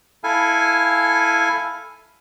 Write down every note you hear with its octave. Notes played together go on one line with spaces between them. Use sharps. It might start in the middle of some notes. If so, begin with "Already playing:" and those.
E4 A4 F5 G#5